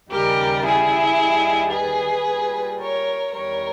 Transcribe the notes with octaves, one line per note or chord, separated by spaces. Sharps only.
D#2 C#3 G3 G4 A#4
E4 G#4
D#2 D#3 G3
G#4 B4
A#2 G3
A#4 C#5
E2 D#3 G3 A#4 C#5